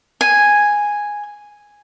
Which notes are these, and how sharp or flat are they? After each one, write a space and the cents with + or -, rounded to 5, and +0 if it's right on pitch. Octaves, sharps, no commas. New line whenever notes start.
G#5 -5